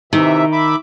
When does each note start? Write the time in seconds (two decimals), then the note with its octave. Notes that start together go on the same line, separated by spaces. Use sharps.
0.13 C3 D#3 E3 E5
0.52 E5 B5 D6